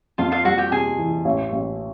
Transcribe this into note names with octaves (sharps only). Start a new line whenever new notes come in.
F2 F4 F5
F4 F5
G3 F#4 F#5
G4 G5
C3 G#4 G#5
E3
A1
A1